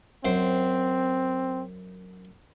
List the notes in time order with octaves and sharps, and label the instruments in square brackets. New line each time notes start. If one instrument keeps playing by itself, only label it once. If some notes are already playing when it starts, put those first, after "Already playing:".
[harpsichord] F#2 C5 G5 [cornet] C4